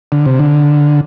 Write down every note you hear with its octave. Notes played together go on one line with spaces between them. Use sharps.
D3
C3
D3